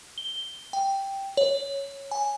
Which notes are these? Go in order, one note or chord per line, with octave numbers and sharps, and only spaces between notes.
G7
G5
C#5
G#5